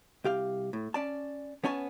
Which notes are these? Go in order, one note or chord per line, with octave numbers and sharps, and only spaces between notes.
C2 G4 F5
A2
C#4 D5 A5
B3 C#4 C#5 G#5 A5